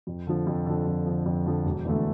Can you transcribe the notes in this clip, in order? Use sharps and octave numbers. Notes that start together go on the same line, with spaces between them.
F2
D3 F3
F2
D3 F3
F2
D3 F3
F2
D3 F3
E1
E2 D3 A3